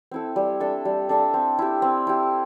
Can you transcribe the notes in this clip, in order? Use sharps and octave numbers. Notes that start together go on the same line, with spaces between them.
C4 E4 A4
G3
D4 A4 E5
G3
D4 A4 E5
C4
E4 G4
C4
E4 G4